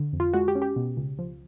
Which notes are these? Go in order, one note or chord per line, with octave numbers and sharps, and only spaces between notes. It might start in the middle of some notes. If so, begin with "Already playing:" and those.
Already playing: D3
F2
F4
G#3 F#4
G4
C#4
G4
B2
C#2
F3